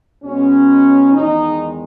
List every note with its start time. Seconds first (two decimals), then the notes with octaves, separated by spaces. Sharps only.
0.23 B2 G#3 B3 C#4
1.12 E2 D#3 G#3 D#4